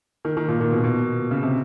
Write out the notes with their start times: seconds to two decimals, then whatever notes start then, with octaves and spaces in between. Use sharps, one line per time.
0.25 D#3
0.37 D#3
0.48 A#2
0.60 A#2
0.72 B2
0.84 B2
1.31 C#3
1.43 C3